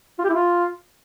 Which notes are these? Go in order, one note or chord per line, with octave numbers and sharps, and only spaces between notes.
F4
G4
E4
F4